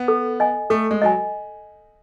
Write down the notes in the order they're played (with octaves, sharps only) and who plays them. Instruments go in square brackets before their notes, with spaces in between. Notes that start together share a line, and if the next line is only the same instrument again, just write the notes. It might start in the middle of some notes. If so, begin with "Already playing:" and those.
Already playing: [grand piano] B3
[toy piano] A4
D#5 G#5
[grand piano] A3 [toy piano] A4
[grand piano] G#3
[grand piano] F#3 [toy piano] D#5 G#5